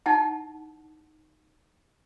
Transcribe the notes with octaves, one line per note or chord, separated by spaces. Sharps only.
D#4 E4 F#5 A5